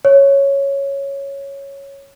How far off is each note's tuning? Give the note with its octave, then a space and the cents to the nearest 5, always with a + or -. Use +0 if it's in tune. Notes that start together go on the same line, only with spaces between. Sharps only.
C#5 +0